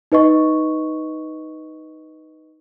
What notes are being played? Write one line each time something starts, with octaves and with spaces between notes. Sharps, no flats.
D#4 B4 D#5 C#6